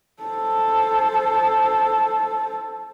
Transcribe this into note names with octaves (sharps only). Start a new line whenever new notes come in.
A4 C5